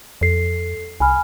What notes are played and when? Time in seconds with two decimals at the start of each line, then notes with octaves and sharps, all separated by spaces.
0.21 F2 A4 C7
1.00 C2 G#5 B5 F6